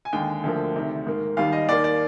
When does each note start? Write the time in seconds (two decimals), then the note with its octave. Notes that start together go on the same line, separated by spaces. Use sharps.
0.05 G#5
0.13 D#2 D3 G#3 G5
0.43 D2 D3 F3 A#3
0.75 D2 C3 D#3
1.06 G#2 D#3 A#3
1.37 D#2 D#3 G3 F5
1.52 D#5
1.68 D#2 D#3 A#3 D5
1.84 D5